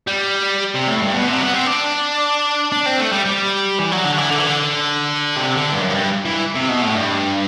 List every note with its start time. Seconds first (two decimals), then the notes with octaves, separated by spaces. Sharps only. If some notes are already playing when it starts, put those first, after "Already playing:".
0.07 G3
0.74 C3
0.87 A2
1.01 G2
1.13 B2
1.27 C3
1.40 B3
1.54 C4
1.66 D4
2.72 D4
2.86 C4
2.98 A3
3.13 G3
3.26 G3
3.79 E3
3.91 F#3
4.04 D3
4.17 E3
4.31 D3
4.39 E3
4.47 D3
5.37 C3
5.55 D3
5.73 G2
5.82 F#2
5.90 G2
6.25 E3
6.55 C3
6.69 B2
6.82 A2
6.96 G2